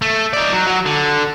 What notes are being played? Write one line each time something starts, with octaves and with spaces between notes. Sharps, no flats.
A3
D#4 D5
F#3
F#3
D3